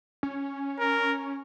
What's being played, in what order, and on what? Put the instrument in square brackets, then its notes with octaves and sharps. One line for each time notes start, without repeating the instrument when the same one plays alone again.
[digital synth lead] C#4
[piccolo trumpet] A#4